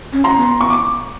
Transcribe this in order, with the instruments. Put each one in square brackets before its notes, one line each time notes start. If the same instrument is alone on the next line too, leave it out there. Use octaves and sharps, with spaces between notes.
[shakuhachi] C#4
[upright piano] A#5 C6
[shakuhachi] B3
[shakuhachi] B3 [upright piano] C#6
[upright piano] D6